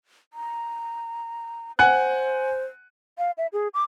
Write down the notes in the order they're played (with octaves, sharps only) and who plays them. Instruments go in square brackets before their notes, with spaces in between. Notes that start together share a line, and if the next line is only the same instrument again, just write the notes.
[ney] A#5
[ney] C5 [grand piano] F#5 G#5 F#6
[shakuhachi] F5
E5
G#4
D6